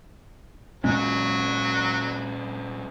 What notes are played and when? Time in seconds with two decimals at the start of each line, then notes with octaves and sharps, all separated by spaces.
0.84 A#2 F#3 G#3 C#4